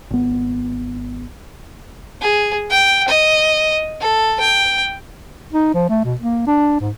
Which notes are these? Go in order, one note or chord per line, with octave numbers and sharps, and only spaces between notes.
G#1 B3
G#4
G5
D#5
A4
G5
D#4
F3
A3
B2
A#3
D4
G#2